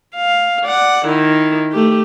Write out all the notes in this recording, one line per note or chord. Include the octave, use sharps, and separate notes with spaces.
F5
D5 F#5
D#3 E4
A3 G4